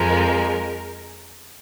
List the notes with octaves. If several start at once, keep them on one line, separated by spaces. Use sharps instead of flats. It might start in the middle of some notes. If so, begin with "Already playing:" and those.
Already playing: F2 F3 G#3 A#4